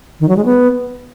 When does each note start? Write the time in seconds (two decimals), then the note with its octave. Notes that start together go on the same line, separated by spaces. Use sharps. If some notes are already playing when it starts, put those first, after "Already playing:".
0.20 D#3
0.28 F#3
0.37 G#3
0.45 B3